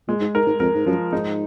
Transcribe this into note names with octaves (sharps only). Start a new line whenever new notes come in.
A#2 G#3
G#2
G#2 A#4
G#2
F2 A#4
G#2
F#2 F3
G#2 D#4